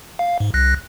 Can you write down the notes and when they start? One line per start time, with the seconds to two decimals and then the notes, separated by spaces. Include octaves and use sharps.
0.19 F5
0.40 G#2
0.54 C2 F#6 A#6